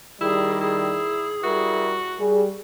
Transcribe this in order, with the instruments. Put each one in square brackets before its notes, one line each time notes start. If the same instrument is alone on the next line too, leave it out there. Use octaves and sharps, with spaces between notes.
[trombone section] D#3 G3 [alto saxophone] E4 [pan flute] G#4
[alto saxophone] E4 [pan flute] G#4
[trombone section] G3 E4 A#4 [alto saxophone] F#4
[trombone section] G3 [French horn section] G#4